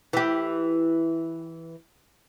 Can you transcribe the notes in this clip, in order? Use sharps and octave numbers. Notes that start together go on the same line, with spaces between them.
E3 G4